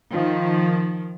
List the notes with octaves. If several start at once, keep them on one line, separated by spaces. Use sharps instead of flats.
D#3 F3